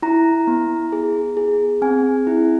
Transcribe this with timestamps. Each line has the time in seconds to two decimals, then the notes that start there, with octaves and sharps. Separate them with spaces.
0.02 E4 A#5
0.47 B3
0.92 G#4
1.37 G#4
1.82 C4 G#5
2.27 E4